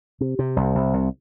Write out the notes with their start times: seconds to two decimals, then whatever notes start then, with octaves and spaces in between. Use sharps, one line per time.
0.21 C3
0.39 C3
0.56 C2
0.75 C2
0.94 C2